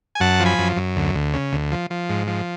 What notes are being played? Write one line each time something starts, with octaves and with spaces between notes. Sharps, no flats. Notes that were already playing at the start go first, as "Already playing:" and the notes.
G#5
F#2 F#5 A5
F3
G#5 B5
F#2
F#2
D2
D2
C#3
D2
F3
F3
G#2
F3